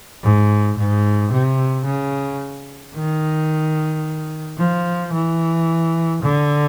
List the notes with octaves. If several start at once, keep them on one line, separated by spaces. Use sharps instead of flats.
G#2
G#2
C3
C#3
D#3
F3
E3
D3